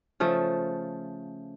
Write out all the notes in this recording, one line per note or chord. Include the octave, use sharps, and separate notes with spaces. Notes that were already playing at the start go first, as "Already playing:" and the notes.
C#3 F3 A3